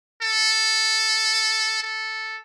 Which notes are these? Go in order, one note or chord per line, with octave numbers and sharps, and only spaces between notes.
A4
A4